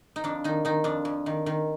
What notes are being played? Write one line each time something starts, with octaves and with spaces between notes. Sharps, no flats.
D#4
F2 D4
D#3 D#4
D#3 D#4
F2 D4
F2
D#3
D#3